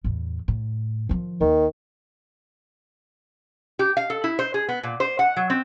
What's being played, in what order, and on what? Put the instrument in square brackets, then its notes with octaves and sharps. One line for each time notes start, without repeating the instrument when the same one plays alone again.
[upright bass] E2 A2
A2
D#3 F3
[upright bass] D#2 [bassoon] D#3
[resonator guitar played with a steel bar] G4
F5
A4
E4
C5
G#4
B3
A#2
C5
F#5
F#3
C4